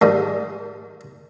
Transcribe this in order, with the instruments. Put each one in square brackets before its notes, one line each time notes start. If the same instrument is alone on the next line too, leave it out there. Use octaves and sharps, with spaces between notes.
[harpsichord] G#2 D#3 G3